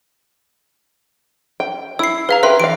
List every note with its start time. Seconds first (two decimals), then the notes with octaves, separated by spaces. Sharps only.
1.60 G5
1.99 E4 E6 C7
2.29 G#4 B4 F5 A#5
2.43 G4 A#4 B4 E5 C6
2.60 E3 F5 D7